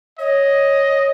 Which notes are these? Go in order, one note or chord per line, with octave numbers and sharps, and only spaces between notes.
C#5 D#5